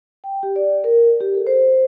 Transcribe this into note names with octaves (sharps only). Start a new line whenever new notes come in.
G5
G4
D5
A#4
G4
A4
C5